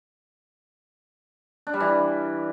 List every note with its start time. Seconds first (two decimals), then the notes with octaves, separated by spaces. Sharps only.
1.67 D4
1.73 G3
1.80 E3